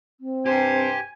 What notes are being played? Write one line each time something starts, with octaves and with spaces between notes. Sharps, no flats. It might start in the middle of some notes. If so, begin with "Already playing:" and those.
C4
G2 C3 G4 C5 G#5